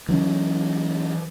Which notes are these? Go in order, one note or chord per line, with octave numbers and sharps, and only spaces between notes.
E3 F#3 C#4